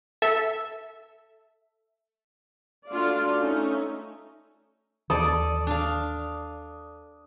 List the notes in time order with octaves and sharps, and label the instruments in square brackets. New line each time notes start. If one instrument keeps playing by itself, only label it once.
[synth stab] A4 E5
[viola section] A3 D4 F4 F#4 D5 F5
A3 C#4 D#4 E5
[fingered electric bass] D#2 D#3 E3 [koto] A4 D5 [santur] D#6
[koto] D4 F5